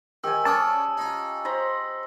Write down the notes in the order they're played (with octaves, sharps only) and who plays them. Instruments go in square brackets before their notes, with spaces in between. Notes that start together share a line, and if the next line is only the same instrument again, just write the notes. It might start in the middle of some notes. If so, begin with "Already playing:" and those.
[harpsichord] D#3 [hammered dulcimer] G4 G#5 [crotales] E6
[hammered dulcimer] C#4 [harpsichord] A4 C#5 D5 [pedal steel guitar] A5 D#6
[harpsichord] D#4 F4
[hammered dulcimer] C5 A#5 B5